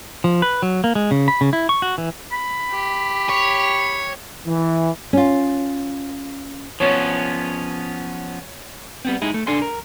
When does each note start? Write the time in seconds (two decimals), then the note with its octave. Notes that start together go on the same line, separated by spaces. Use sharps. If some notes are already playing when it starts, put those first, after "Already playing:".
0.24 F3
0.42 B4
0.62 F#3
0.84 A#3
0.95 G#3
1.11 C#3
1.28 B5
1.41 C#3
1.53 E4
1.69 C#6
1.82 F#4
1.98 E3
2.32 B5
2.71 G4
3.29 C#5
4.46 E3
5.13 C#4 F4
6.80 F3 B3 C#4 C#5
9.05 G3 B3 C4
9.22 G#3 D#4 E4 G#4
9.34 A3
9.47 C2 D4 A4 G#5 C6
9.62 A#4